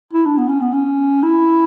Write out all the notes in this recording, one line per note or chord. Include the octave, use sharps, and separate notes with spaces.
E4
D4
B3
C#4
B3
C#4
E4